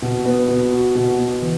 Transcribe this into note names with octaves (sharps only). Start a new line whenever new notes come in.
B2
B3
B2
F#4
B2
B3
E3